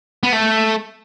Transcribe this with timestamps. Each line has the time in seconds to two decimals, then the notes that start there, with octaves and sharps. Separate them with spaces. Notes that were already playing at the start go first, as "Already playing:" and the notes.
0.23 B3
0.33 A3